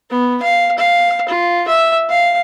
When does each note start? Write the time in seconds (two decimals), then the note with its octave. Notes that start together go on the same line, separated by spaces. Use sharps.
0.10 B3
0.42 F5
0.78 F5
1.28 F4
1.68 E5
2.09 F5